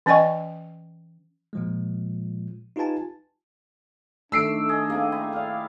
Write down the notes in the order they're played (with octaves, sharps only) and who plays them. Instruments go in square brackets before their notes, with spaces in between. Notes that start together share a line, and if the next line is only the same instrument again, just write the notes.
[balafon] E3 C#4 D5 D#5 G5 C#6
[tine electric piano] A#2 F3 G#3
D#4 F4 G4 B4 G#5 A5
[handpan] D#3 A3 [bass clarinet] D4 [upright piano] E6 C7 D7
[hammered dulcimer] G#4 D#5
[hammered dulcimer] A#3 [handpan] C4 G#4
[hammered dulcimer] E4
[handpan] D5 F5